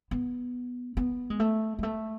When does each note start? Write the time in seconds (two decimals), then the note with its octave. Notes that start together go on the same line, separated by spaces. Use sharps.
0.11 B3
0.97 B3
1.30 G#3
1.40 A3
1.79 G#3
1.83 A3